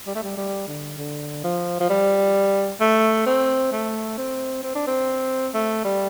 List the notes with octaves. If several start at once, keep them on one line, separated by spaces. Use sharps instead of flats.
G3
A3
G3
G3
D3
D3
F3
F3
G3
A3
C4
A3
C4
C4
D4
C4
A3
G3